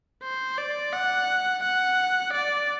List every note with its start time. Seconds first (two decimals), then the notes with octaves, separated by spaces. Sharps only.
0.23 C5
0.58 D5
0.93 F#5
1.63 F#5
2.33 D5